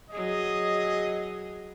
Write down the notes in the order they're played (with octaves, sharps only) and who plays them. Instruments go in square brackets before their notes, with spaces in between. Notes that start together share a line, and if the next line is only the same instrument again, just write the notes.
[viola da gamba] F#3 G#4 [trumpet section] D#5